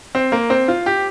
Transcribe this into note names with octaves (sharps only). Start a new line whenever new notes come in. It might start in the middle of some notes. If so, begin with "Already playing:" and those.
C4
A#3
C4
F4
G4